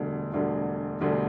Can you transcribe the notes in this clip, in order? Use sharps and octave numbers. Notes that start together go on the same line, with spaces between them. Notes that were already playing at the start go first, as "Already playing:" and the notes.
Already playing: E1 D2 D3 G3 D4
E1 D2 D3 G3 D4
E1 D2 D3 G3 D4